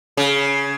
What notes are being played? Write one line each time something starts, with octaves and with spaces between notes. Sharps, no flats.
C#3